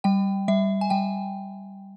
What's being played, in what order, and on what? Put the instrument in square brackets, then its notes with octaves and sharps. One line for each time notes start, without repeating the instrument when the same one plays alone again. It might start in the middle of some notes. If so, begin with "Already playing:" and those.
[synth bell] G3 G5
G3 E5
G#5
G3 G5